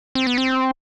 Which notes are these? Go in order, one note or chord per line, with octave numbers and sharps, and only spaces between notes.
C4
B3
C4